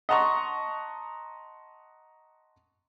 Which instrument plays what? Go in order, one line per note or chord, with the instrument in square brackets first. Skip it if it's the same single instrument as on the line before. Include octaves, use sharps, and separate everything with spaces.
[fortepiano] D#5 F#5 A5 A#5 C6 C#6